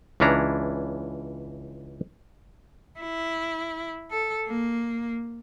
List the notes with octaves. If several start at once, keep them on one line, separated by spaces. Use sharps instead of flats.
C#2 E3 C#4 D4 A#5
E4
A4
A#3